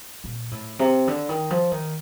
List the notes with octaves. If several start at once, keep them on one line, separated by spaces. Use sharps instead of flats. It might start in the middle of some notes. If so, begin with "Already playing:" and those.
A#2
A2
C3
D3
D#3
F3
D#3